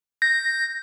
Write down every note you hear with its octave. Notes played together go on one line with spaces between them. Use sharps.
G6 A#6